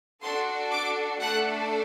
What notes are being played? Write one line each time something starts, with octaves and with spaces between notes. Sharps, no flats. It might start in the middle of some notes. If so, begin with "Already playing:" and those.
D4 F#4 A4 C6
D6
A3 D4 A4 F#5